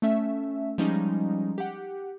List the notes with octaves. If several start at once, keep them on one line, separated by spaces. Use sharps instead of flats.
A3 C#4 E5
F3 G3 G#3 C#4 D#4
G4 F#5